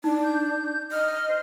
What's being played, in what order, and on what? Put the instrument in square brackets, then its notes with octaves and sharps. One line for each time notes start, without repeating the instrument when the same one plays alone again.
[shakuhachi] D4 [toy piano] D#4
[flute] G6
[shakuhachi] D#5 [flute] F6
[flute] C5